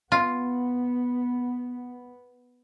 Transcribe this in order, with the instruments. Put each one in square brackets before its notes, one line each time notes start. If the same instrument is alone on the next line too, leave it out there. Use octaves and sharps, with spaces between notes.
[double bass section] B3 [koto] F4